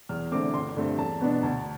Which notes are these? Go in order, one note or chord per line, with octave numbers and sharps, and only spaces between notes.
E2 F6
D3 A3 C4 D6
G1 C6
G2 D3 A3 C4
E2 A5
B2 B3 D4
D2 A5